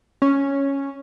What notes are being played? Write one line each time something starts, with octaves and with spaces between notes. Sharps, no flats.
C#4